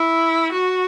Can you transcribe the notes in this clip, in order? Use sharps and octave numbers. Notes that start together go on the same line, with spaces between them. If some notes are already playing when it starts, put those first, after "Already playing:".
Already playing: E4
F#4